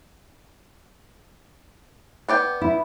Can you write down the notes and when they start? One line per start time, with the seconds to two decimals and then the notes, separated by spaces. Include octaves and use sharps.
2.29 B3 D5 G5
2.61 E4